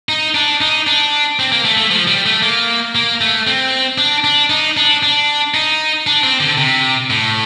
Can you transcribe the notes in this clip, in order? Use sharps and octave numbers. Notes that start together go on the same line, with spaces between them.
D#4
D4
D#4
D4
C4
A#3
A3
A3
F3
G3
A3
A#3
A#3
A3
C4
D4
D4
D#4
D4
D4
D#4
D4
C4
D3
C3
A2